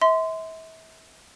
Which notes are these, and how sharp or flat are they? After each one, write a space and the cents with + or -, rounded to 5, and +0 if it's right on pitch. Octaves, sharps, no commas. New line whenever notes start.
E5 -35 C6 -20